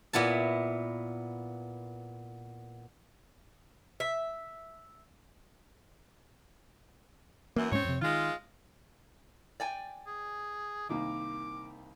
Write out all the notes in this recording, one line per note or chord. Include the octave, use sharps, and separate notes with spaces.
A#2 B3 E4 A5
E5
F#2 E3 A#3
G#2 G#3 C4 C#4 C#5
F2 C3
D#3 G#3 F4
D5 G5 G#5
G#4
C2 D#3 A#3 D6